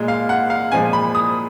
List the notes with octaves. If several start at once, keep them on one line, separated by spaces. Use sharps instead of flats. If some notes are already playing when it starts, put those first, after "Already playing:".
Already playing: A#2 G#3
F5
F#5
F5
A#2 F3 G#3 G#5
B5
D#6